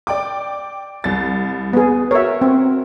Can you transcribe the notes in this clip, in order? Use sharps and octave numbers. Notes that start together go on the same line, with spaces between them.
D5 G5 D6
C2 A6
B3 G#4
F#4 A#4 C#5 E5
C4